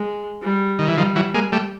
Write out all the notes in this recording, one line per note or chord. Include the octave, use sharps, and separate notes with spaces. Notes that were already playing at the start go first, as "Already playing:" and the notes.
Already playing: G#3
G3
D#3
E3
D#3 F3 G3
E3 F#3
G#3 A#3
G3 A3